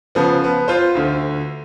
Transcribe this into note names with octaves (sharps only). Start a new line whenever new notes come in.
C#3 F3 B3
B3
F4 C5
D2 D3